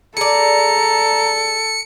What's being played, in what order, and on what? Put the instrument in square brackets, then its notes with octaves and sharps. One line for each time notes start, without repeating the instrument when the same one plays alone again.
[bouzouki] G#4 D5 [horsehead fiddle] A4 [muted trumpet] A#5 [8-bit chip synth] C#7